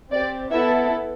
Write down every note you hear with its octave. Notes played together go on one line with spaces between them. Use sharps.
C4 G4 D5
B3 E4 A4 E5